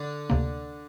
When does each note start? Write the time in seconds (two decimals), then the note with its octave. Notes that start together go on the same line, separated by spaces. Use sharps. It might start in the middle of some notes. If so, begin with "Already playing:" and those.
Already playing: D3 D4
0.30 D2 C3 A#3